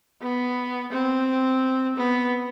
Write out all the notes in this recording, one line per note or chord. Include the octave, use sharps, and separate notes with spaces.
B3
C4
B3